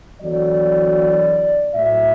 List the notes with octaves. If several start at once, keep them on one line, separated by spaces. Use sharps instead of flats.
E2 D3 F#3 D5
A2 F#3 E5